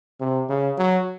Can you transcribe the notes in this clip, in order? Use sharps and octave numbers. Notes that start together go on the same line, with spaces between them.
C3
C#3
F#3